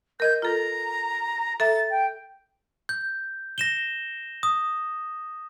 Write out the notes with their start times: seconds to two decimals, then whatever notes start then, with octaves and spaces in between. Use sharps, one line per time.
0.20 A#4 D#5 G6 G#6
0.42 F4 A4 A#5
1.60 A4 E5 A#5 A6
1.90 G5
2.89 G6
3.58 A#6 E7 G7
4.43 D#6